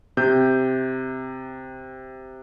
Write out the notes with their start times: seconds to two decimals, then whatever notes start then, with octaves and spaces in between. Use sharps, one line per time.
0.17 C3 G6